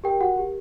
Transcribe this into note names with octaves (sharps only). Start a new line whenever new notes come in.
G4 A#4 G5
F#4 F#5
G4